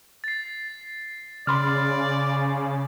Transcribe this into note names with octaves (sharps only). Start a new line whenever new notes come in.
A6 C7
C#3 D5 B5 C6 F6